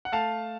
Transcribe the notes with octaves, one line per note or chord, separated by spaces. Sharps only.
F#5
A3 F5 A5